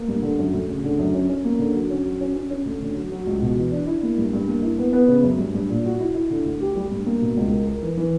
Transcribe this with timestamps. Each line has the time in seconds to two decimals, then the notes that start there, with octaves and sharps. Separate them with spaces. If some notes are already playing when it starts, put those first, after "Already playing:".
Already playing: A#3
0.08 G2
0.22 D3
0.39 F#2
0.54 D2
0.69 C#3
0.84 D3
0.99 F#2
1.14 C#4
1.29 C#4
1.44 A#3
1.59 D3
1.74 F#3
1.90 C#4
2.05 F#3
2.21 C#4
2.36 C#4
2.51 C#4
2.65 D2
2.82 D3
2.96 F#3
3.11 F#3
3.27 C#2
3.42 B2
3.57 E3
3.71 D4
3.87 E4
4.03 A#3
4.18 G2
4.33 G2
4.47 A#3
4.63 E4
4.78 B3
4.93 B3
5.08 C#3
5.23 F#2
5.39 G2
5.54 G2
5.69 A#2
5.85 F#4
6.00 E4
6.14 E4
6.30 D3
6.45 D2
6.60 G4
6.75 G3
6.91 G2
7.06 A#3
7.21 B2
7.37 C#2
7.51 A#4
7.67 A#4
7.82 E3
7.97 E3